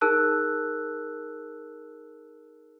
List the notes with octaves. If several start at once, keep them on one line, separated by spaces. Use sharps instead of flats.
D#4 G#4 A#4 A5 E6 F#6